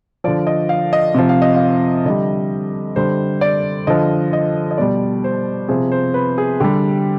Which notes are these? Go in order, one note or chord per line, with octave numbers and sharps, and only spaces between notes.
D3 F3 D5
D#5
F5
D#5
C3 F3
F5
D#5
F5
D3 G3 D#5
D3 G3 C5
D5
D3 F3 D#5
D#5
D#5
B2 G3 D5
C5
C3 F3 G#4
C5
B4
G#4
D3 G3 G4